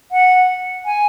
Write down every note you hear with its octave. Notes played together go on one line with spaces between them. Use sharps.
F#5
G#5